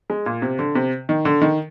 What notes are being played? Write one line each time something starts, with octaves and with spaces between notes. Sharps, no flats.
G#3
A#2
C3
D3
C3
D#3
D3
D#3